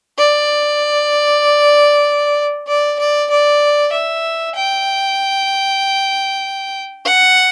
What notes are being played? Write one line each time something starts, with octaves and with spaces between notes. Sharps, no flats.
D5
D5
D5
D5
E5
G5
F#5